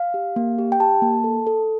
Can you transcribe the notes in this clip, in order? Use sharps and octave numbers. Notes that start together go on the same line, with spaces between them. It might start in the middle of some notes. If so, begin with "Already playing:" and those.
Already playing: F5
G4
A#3
G4
G5
G4 A5
A#3
A4
A4